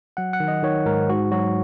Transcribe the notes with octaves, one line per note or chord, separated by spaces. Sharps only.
F#3 F#5
F#5
D#3
D#5
D#3 C#5
G#2 A#4
G#2 F#4
F#3 F#4